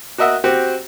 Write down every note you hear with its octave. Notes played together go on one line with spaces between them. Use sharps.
F#4 A#4 D#5 E5 F#5
C4 F#4 G4